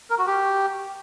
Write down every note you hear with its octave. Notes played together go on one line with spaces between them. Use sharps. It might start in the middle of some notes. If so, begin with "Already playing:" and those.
A#4
F#4
G4